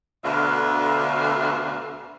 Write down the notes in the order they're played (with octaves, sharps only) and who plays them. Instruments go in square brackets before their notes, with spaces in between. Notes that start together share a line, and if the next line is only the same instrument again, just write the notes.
[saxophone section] D2 B2 D3 E5 F5